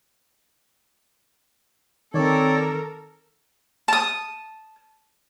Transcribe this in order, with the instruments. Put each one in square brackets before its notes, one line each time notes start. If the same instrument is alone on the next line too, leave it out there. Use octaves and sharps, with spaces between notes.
[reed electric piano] D#3 [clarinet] C4 [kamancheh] A4 A#4 [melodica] C#5 D5
[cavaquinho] A5 D#6